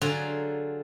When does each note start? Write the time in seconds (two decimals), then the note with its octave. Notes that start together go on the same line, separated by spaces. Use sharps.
0.02 D3 F#3 F4 G#4 A#5